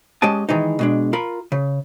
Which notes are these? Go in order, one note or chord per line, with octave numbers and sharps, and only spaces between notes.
G#3 C#4 G4 D#5 A5
D#3 E3 G#3 D#4
B2 G#3 D4
F4 A#4 B5
C#3